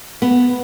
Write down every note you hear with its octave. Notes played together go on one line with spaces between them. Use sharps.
B3